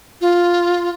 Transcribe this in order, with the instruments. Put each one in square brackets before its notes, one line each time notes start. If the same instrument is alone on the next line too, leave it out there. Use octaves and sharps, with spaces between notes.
[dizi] F4